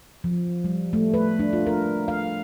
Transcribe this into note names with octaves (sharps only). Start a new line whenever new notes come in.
F3
G3
A3
B4
D4
F4
A#4
F5